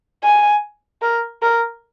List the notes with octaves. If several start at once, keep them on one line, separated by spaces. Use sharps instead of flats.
G#5
A#4
A#4